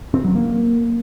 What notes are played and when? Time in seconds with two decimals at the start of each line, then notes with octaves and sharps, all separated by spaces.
0.14 C4
0.24 F#3
0.35 A#3